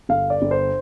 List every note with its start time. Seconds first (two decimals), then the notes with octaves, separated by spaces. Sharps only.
0.09 G1 F5
0.30 D5
0.42 G1
0.51 C5